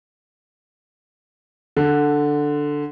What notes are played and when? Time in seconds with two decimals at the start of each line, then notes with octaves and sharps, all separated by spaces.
1.77 D3